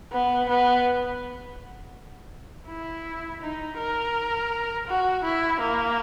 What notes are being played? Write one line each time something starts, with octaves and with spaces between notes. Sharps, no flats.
B3
B3
E4
D#4
A#4
F#4
E4
A#3